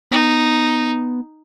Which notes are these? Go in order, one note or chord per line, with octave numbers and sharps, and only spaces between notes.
B3 D#4